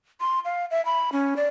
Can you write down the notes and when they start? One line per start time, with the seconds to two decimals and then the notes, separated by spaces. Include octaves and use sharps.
0.21 C6
0.45 F5
0.71 E5
0.85 B5
1.12 C#4
1.37 D5